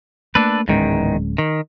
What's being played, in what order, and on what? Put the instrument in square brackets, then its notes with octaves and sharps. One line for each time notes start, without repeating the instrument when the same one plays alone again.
[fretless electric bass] A3 A#3 [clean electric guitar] D4 A4 B4
[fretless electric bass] D1 G#3 C#4 [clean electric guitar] E2 G#2 D#3
[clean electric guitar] D#3